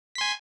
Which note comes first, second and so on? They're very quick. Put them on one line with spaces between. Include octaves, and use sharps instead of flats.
B6 C6 G#5